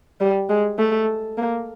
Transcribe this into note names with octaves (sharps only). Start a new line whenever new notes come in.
G3
G#3
A3
A#3